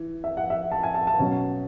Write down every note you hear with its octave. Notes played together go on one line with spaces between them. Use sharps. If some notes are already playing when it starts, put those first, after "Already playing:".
Already playing: E3
E5
F#5
E5
A5
G#5
A5
A5
B2 F#3 C#4